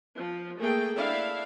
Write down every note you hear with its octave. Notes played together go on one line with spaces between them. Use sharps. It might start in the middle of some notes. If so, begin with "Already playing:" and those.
F3
A3 A#3 G#4 A4 G5
D4 E4 E5 F5